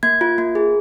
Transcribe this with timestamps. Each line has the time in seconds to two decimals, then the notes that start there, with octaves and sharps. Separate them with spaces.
0.03 A#3 G#6
0.21 F4
0.38 A#3
0.55 G#4